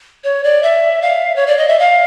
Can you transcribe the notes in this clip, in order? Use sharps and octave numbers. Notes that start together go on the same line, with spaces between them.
C#5
D5
E5
F5
C#5
D5
D#5
E5
F5